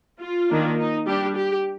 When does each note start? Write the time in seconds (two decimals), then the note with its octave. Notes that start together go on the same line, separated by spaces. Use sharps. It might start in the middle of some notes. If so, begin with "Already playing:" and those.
0.20 F4
0.49 D#3 A#3 D4
0.77 D#4
1.06 G3 D4 G4
1.35 G4